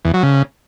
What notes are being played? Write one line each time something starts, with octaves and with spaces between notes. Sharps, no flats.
E2
F#3
C#3